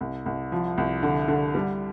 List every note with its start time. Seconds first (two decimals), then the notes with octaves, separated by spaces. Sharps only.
0.01 C2
0.26 C2
0.52 F3
0.78 C2
1.03 D3
1.28 D3
1.55 G3